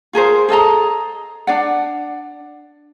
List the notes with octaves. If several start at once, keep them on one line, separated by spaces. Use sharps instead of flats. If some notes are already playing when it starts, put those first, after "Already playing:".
F4 G#4 A#4 C5
G#4 A4 D#5 A#5
D4 D5 F#5